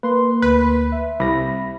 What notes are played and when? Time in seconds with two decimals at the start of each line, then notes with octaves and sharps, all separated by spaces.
0.03 A#3 B4 C6
0.42 D2 B4
0.92 E5
1.20 C2 B5 A#6